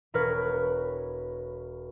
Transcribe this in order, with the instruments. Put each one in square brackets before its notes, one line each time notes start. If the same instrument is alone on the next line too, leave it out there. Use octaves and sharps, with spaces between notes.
[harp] E1 A#4 B4 C#5 F6 G#6